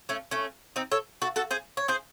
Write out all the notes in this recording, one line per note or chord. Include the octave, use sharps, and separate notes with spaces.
A3 C#4
A3 C#4
C4 D#4
A4 C#5
F#4 A4
F#4 A4
G#4 C5
C#5
G#4 C5